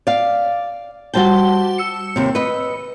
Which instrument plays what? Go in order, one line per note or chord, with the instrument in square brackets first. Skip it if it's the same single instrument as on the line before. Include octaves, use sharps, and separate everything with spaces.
[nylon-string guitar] D5 F5
[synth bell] G3 A5 G7 [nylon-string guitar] F#4 C5 G5
[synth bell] E6 C#7
[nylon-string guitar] D#2 C3
B4 D#5